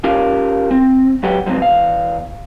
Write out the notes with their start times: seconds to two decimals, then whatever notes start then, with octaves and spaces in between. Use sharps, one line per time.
0.04 C#4 F4 G4 A#4 F5
0.71 C4
1.23 F#3 G4 B4 F#5 G5
1.46 C3 F3 F#3 G#3 B3 C4
1.60 E2 F5